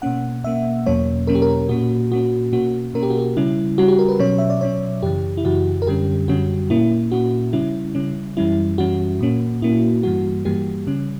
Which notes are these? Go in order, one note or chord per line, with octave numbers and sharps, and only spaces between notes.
B2 A#3 C#4 F#5
B2 A#3 C#4 E5
E2 B2 F#3 A#3 C#4 C#5
E2 B2 F#3 A#3 C#4 A#4
G4
A#4
A#2 A#3 C#4 F#4
A#2 A#3 C#4 F#4
B2 A#3 C#4 F#4
B2 A#3 C#4 A#4
G4
F#4
G4
C#3 G3 C#4 E4
C#3 G3 C#4 F#4
G4
A#4
B4
B2 F#3 C#4 C#5
E5
D5
B2 F#3 C#4 C#5
F#2 C#3 E3 G4
E4
F#2 C#3 E3 F#4
A#4
F#2 D3 G3 C#4 G4
F#2 D3 G3 C#4 F#4
A#2 A#3 C#4 E4
A#2 A#3 C#4 F#4
C#3 G3 C#4 E4
C#3 G3 C#4
F#2 E3 G3 C#4 E4
F#2 E3 G3 C#4 F#4
A#2 A#3 C#4
A#2 A#3 C#4 E4
G2 E3 G3 A#3 F#4
G2 E3 G3 A#3 G4
C#3 G3 C#4